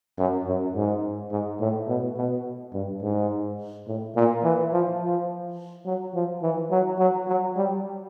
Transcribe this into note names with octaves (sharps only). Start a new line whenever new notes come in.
F#2
F#2
G#2
G#2
A2
B2
B2
G2
G#2
A2
A#2
E3
F3
F3
F#3
F3
E3
F#3
F#3
F#3
G3